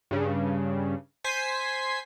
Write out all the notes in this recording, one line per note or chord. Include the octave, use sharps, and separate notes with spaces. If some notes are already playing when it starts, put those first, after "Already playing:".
G2 C#3
C5 G#5 B6 C7